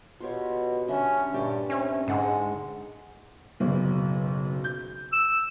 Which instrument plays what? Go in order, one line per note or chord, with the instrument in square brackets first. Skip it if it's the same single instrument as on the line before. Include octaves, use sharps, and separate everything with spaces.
[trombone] B2 [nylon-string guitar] F4 G4 C#5
[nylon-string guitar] D3 G3 E5 [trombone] C#4
[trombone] G2 [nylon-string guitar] A#2 D4 G4
[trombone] C3 [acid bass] C#4
[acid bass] G#2 [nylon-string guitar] D3 F#5 [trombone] G#3
[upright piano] F#1 B1
G6
[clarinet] E6